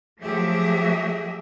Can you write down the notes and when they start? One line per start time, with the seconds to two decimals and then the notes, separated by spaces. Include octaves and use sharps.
0.21 F3 F#3 A3 G4 G#4 E5